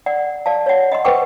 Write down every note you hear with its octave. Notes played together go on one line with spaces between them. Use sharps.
D5 F#5
D5 F5 A5
C#5 F#5
D#5 F#5 C6
B4 C5 F#5 G5 C#6 D6